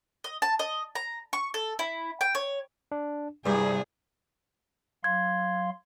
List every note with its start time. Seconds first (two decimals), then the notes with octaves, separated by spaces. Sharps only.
0.24 D#5
0.42 A5
0.59 D#5
0.95 A#5
1.33 C#6
1.54 A4
1.79 E4
2.21 G5
2.35 C#5
2.92 D4
3.46 C2 G2 G#4 D5
5.04 F#3 F5 C6 G#6